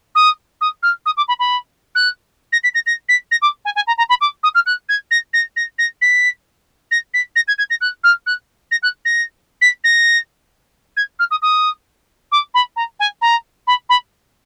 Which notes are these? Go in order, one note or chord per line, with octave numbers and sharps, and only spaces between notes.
D#6
D#6
F6
D#6
D6
B5
B5
F#6
A#6
B6
A#6
A#6
B6
A#6
D6
G#5
G#5
A#5
A#5
B5
D6
D#6
F6
F#6
G#6
A#6
A#6
A#6
A#6
B6
A#6
B6
A#6
G#6
G#6
A#6
F#6
F6
F#6
A#6
F#6
A#6
B6
A#6
G#6
F6
D#6
D#6
D6
B5
A#5
G#5
A#5
B5
B5